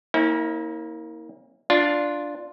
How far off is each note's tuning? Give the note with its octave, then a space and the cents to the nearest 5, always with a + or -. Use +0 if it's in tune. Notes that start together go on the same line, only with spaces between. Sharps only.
A#3 +0 C#4 -30 E4 -45
D4 +0 F4 +0